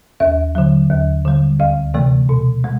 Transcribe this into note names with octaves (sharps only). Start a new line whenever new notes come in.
D#2 E5
D3 F#3
D#2
D3 G3
D2 F5
C3 E3 A3
B2
G#3